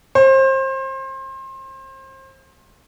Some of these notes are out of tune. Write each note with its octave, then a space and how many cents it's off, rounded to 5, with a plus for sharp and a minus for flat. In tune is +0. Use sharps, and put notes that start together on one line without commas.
C5 +30